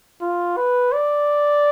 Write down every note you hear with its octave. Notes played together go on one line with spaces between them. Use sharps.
F4
B4
D5